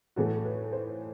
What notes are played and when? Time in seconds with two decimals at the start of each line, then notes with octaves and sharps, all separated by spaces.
0.16 A2 E3 A3 F#4
0.45 B4
0.73 C5